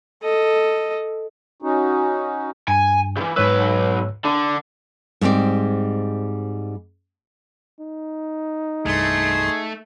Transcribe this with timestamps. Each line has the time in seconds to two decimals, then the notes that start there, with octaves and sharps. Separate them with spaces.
0.22 A4 D#5
1.62 C#4 D#4 F#4
2.68 G2 G#5
3.17 C#3 E3
3.36 B1 G#2 B4 C#5 E6
4.25 D3 D4
5.21 G#2 G3 G#3 C4 D5
7.80 D#4
8.86 C2 G2 A3 G#4 C6